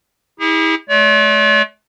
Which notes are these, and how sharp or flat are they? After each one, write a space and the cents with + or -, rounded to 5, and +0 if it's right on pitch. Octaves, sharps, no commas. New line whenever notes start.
E4 -35 G#4 -40
A3 -45 D5 -45